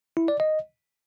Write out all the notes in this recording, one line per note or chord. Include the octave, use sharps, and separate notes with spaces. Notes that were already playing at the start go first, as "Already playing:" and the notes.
E4
D5
D#5